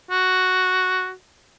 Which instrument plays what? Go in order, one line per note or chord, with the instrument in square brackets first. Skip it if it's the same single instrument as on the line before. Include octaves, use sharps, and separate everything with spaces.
[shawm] F#4